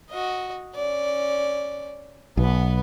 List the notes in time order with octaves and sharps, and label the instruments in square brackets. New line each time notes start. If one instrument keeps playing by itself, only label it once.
[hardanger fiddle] F#4 D#5
C#4 D5
[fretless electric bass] B1 [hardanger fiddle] B3 B4